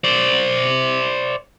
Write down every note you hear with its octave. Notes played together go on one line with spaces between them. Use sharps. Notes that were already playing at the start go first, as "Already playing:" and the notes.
C5 D5